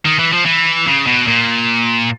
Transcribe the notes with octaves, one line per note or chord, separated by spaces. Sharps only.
D#3
E3
F3
E3
C#3
B2
A#2